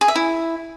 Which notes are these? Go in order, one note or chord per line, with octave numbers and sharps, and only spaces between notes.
G#4
E5
E4